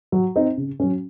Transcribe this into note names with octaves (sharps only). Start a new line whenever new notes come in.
F#3
C4 D#4
C#3
F#3 C#4